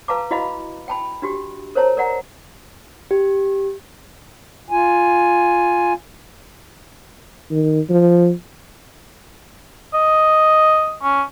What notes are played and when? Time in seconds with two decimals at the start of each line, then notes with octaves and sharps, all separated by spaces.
0.08 B4 F5 A5 A#5 D6
0.31 E4 F#4 D#5 F5 B5
0.88 G5 A5 B5
1.22 D4 F#4 G4
1.75 A#4 C5 C#5 A5 A#5
1.97 A#4 D5 F#5 A#5
3.11 G4
4.71 F4 G#5
7.51 D#3
7.89 F3
9.94 D#5
11.03 C#4